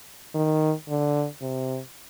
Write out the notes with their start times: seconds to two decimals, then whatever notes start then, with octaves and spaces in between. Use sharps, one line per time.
0.35 D#3
0.89 D3
1.42 C3